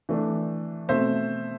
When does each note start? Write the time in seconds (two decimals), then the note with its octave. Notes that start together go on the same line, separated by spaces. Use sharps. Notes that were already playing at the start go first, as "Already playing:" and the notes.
0.09 E3 A3 D4
0.88 B2 A3 C4 C5 E5